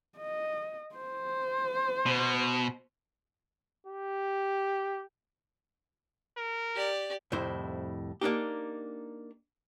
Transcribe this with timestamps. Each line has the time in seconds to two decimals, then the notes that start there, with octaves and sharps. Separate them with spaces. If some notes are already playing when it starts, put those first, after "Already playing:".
0.18 D#5
0.95 C5
2.06 B2
3.87 G4
6.37 A#4
6.75 G4 D5
7.32 C2 F2 A2 E4 C5
8.21 A#3 D4 D#4 G4